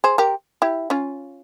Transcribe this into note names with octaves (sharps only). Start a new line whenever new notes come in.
G#4 C5
G4 A#4
E4 G4
C#4 F4